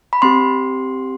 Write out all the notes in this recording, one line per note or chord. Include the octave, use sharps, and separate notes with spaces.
B5
C4 G4 C6